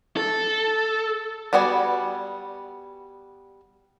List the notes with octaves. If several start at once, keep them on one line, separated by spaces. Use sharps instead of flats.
A4
G3 B3 F#4 D5 G#5